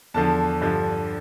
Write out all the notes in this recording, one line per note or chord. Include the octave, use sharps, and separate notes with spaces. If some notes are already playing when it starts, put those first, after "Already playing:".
E2 D3 F3 A5
G2 D3 F3